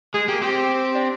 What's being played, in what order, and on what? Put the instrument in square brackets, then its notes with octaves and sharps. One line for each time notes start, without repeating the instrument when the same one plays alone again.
[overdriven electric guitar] G#3 [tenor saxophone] G#4
[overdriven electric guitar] A#3 [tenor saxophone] G4
[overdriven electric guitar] C4 [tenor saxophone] G4
[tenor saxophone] D4